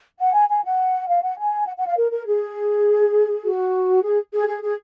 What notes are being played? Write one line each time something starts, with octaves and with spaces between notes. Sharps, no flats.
F#5
G#5
G#5
F#5
F5
F#5
G#5
F#5
F#5
F5
A#4
A#4
G#4
F#4
G#4
G#4
G#4
G#4